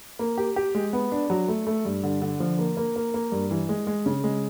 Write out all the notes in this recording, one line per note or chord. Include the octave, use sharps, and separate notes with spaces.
A#3
G4
G4
G#3
B3
D4
F#3
A3
A3
G2
D3
D3
F3
A#3
A#3
A#3
A#3
G2
E3
G#3
G#3
C#3
G#3